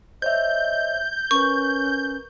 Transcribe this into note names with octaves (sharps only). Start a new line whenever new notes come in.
C5 C#5 D#5 E5 G6
C#4 A#4 B4 C#6